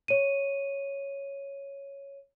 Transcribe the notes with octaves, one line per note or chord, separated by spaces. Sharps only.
C#5 D#7